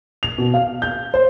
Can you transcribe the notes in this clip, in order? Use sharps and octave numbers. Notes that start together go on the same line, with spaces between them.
F7
B2
F5
G6
C5